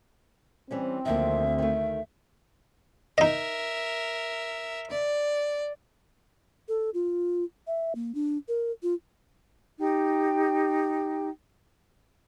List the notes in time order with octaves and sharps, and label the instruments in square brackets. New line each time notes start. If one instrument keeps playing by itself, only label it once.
[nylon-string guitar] E3 G3 C#4 [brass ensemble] C4
[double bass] D2 [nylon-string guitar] D#3 F3 A#3 [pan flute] E5
[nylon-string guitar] D#3 A3
[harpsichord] D#4 D#5 [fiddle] A#4 E5
[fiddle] D5
[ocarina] A4
F4
E5
A#3
D4
A#4
F4
[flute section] D#4 G4 G5